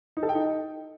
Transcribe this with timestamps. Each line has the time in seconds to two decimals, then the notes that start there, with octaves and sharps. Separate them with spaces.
0.17 D#4
0.23 A4
0.29 G5
0.35 D#4